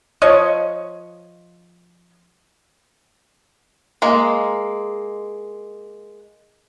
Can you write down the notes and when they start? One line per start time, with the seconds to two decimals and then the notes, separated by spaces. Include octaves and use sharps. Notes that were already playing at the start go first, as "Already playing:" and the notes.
0.22 F3 C#5 D#5
4.02 G#3 A#3